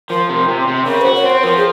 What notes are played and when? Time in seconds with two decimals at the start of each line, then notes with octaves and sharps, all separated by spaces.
0.10 F3 A#4
0.29 C3
0.48 C3
0.67 C3
0.86 C#3 A#4
1.01 F#4 C5
1.15 C#5
1.24 C4
1.30 C5
1.43 F3 A#4
1.57 G#4